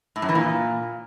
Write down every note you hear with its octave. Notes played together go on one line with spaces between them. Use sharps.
A2
F#2
E3
A#2